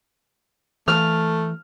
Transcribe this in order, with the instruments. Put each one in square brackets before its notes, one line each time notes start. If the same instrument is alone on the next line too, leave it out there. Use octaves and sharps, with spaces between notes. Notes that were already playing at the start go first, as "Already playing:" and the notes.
[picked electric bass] E3 [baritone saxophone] A3 [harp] F6